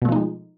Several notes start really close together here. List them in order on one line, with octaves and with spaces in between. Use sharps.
B2 A3 F3 D#4 G#3